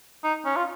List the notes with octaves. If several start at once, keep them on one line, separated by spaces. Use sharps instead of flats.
D#4
C#4
F4